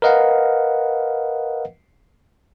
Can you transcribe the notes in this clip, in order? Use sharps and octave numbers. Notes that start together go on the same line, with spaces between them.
A#4 B4 D#5 F5 F#5